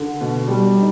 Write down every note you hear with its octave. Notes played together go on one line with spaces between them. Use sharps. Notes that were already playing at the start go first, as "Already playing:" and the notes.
Already playing: D3
B2
G3
D#4